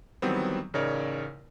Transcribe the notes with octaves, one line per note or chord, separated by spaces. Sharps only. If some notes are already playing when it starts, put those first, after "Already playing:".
D#3 E3 F#3 G3 B3 C4
A1 C#3 D#4 A#4 C#5 D5